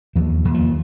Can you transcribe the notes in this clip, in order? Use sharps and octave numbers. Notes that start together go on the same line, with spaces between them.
D#2 F3
D#2
F3